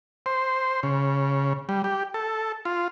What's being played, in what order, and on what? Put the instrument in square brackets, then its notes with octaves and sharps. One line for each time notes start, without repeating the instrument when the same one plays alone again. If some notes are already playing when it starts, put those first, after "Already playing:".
[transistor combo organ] C5
C#3
G3
G4
A4
F4